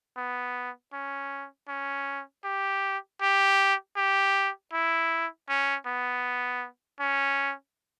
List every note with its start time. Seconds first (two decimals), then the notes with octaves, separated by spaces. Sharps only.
0.17 B3
0.93 C#4
1.68 C#4
2.44 G4
3.22 G4
3.97 G4
4.73 E4
5.49 C#4
5.87 B3
7.00 C#4